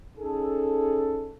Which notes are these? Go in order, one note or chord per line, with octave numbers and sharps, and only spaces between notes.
C#4 D#4 G#4 A4